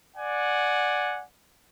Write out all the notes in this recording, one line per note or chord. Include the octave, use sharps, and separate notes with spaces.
D5 F#5 G#5